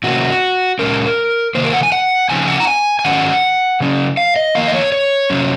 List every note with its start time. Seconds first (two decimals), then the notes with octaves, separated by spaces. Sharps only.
0.04 C3 D#3 A#3 C#4 F#4
0.79 A#2 G#3 C#4 A#4
1.55 C3 D#3 A#3 C5
1.64 A#4
1.73 F#5
1.83 G#5
1.92 F#5
2.30 C#3 F3 C4 D#4 G#5
2.48 F#5
2.60 A#5
2.67 G#5
2.99 G#5
3.04 G#2 D#3 F#3 C#4 F#5
3.80 C#3 F#3 C#4
4.17 F5
4.36 D#5
4.55 F2 D#3 A#3 F5
4.68 D#5
4.74 C#5
4.92 C#5
5.30 C3 F#3 C#4